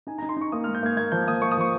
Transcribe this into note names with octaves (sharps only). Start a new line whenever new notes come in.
D#4 G#5
D#4 A#5
C6
D#4 C#6
A#3 D#6
G#2 F6
G6
A#3 G#6
A#3 G#6
F3 G6
A#3 D#6
A#3 C#6
D#6
F3 C#6